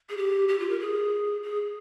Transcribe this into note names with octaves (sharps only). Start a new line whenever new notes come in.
G#4
G4
G4
F4
A#4
G#4
G#4